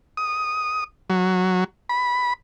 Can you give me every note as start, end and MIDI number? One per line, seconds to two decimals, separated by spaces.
0.17 0.84 87
1.10 1.64 54
1.89 2.33 83